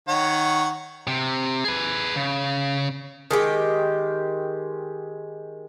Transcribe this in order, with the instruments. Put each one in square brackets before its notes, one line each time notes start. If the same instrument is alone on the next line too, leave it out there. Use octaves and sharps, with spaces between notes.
[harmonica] D#3 C#5 F#5
[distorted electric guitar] C3
G#4 B4
C#3
[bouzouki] D#3 G#3 G4